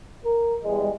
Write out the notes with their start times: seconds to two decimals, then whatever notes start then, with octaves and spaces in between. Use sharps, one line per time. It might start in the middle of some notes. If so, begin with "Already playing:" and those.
0.25 A#4
0.63 E2 G3 G#3